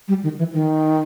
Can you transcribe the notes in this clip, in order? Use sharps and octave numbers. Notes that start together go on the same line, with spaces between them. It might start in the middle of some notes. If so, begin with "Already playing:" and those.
G3
D#3
E3
D#3